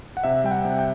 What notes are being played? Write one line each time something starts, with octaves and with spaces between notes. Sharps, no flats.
F#5
C3 E5
G3 G5
F#5
C3
G5